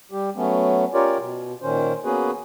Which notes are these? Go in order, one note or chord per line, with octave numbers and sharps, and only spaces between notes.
G3 G4
F#3 A3 B3 C#4
C#4 F4 G4 A#4 C#5 D5
B2
A#2 D#3 C#4 C5
A#3 B3 C#4 F#4 G#4 B4